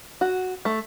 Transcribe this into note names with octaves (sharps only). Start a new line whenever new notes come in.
F#4
A3